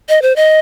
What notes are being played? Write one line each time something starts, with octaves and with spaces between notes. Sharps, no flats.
D#5
C5
D#5